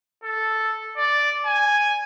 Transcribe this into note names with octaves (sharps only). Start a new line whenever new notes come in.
A4
D5
G#5